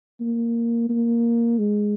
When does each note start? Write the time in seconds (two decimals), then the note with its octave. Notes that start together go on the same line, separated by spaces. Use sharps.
0.20 A#3
0.89 A#3
1.59 G#3